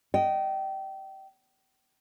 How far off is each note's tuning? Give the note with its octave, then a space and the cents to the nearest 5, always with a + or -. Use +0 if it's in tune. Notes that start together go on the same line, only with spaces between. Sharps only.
D#5 -5 G5 -25